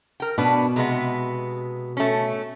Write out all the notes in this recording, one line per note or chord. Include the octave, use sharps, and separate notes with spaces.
A#4 G5
B2 B3 D4 B4
C3 G#3 B3
A3 C#4